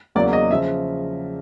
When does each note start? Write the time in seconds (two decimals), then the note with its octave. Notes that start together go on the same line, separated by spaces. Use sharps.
0.15 E2 C#3 F#3 A#3 D5
0.33 D#5
0.51 C#3 F3 E5